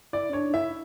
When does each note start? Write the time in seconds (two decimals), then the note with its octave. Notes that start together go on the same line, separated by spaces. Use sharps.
0.13 E4 D5
0.30 C#4
0.33 D4 C#5
0.49 D4
0.54 E4 E5